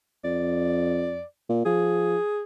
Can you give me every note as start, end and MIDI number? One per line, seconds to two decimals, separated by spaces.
0.24 1.22 41
0.24 1.23 74
1.49 1.63 46
1.65 2.17 53
1.65 2.43 68